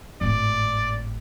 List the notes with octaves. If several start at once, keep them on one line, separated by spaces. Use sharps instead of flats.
G#1 A2 D5